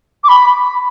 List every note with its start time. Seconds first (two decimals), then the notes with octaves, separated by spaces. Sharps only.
0.24 D6
0.28 B5